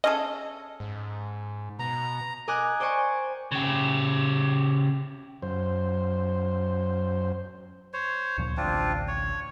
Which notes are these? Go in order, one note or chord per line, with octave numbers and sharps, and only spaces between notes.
C#4 G#4 A4 D#5
G#2
B2 A#5
A#4 D#5 G#5 D6 F#6
C5 D5 G5 G#5 C#6
C#3 G4
F#2 C5
C5 C#5
D2 A#2 F3
A1 D2 C4 D4 F4
C#5